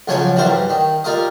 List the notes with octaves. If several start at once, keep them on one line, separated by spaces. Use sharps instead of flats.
C#2 F3 F#3 C#5 G#5
E3 F#3 G3 A#4 C5
G2
D#3
G3 F4 A#4 D#5